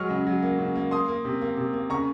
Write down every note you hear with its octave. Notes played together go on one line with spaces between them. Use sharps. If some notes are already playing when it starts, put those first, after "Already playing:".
Already playing: F#3 G#3 C#6 F6
C#3
F#3
A#3
C#3
A#3
A#3 C6 D#6
A#3
C3
A#3
C3
A#3
C#3 A#5 C#6